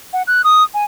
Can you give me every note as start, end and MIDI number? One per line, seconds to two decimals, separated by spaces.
0.13 0.23 78
0.27 0.42 90
0.44 0.63 87
0.74 0.84 80